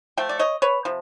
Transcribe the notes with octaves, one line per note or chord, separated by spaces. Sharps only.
F3 A3 G5
D5
C#5 D#5
B4 C#5
C3 F3